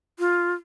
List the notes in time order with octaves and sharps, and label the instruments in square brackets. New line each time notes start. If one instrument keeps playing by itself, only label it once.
[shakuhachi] F4